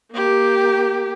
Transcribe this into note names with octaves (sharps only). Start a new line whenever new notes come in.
A#3 G4